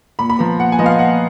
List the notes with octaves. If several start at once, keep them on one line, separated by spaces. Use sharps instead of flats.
A#2 B5
B5
F3 B3 A#5
A#2 F#5
G#5
F3 B3 D#5
F5
A#2 F#5